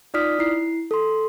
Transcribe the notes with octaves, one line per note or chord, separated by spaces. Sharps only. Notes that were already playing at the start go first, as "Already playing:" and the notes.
D#4 F4 D5 D#6 F6 B6
E4 C7
A4 C6